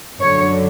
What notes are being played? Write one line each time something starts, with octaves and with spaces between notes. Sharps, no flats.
F#2 D3 F#3 C#5